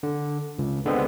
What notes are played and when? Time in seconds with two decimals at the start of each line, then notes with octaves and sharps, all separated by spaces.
0.03 D3
0.59 C#2
0.86 D3 G#3 B3 C4